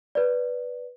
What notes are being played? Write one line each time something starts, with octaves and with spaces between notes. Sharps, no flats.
B4 D5